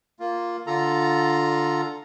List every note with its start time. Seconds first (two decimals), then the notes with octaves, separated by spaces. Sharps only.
0.20 A#3 F4
0.67 D3 F4 A4 A#5